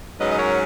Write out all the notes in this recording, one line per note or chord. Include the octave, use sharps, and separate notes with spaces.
G#2 F#3 C#4 B4 D#5
D#5
A#4 C#5